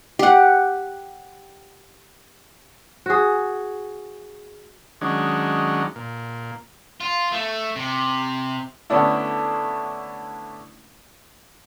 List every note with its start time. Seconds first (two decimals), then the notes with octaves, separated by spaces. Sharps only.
0.19 G4 F#5
3.06 F#4 G#4
5.01 D#3 F#3 G#3 C#4 D4
5.96 A#2
7.01 F4
7.32 A3
7.76 C3
8.90 D3 A3 B3 C#4 D4 E4